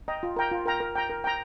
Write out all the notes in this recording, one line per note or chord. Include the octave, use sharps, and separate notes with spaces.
D#5 G5 A#5
F4
A#4 G5 A#5
F4
A#4 G5 A#5
A#4
G5 A#5
A#4
G5 A#5